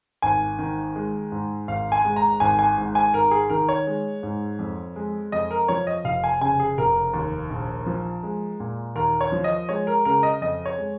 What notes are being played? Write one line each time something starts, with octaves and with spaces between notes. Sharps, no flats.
G#1 G#5
D#3
G#3
G#2
G#1 F5
G#5
G#3
A#5
G#1 G#5
G#5
G#2
G#5
G#1 A#4
G#4
D#3 A#4
C#5
G#3
G#2
F2
G#3
F2 D#5
A#4
F3 C#5
D#5
F1 F5
G#5
C#3 G#5
G#4
F1 A#4
D#2
A#1
F3
G#3
A#2
D#2 A#4
C#5
F3
D#5
G#3 C#5
A#4
C#3 A#4
D#5
F2 D#5
C#5
G#3